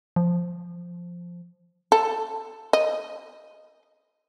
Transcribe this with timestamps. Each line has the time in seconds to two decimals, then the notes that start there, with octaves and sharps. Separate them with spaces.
0.16 F3
1.92 A4
2.73 D#5